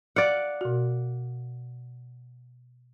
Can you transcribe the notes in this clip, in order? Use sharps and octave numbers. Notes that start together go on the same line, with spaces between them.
D5 F5 F#5
B2 F#4